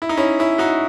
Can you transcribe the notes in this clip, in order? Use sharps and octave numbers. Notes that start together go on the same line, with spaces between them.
E4
D#4
C#4 E4
C#4 E4
D#4 F#4